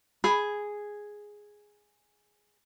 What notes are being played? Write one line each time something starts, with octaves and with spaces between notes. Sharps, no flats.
G#4 B5